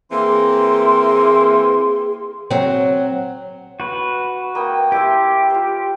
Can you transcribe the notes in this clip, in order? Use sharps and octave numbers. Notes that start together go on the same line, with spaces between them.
E3 A#3 C4 G#4 C6
F#3 C4
F#4 B4
A#3 G5 D#6
E4 G4 E5 C6
F4 C5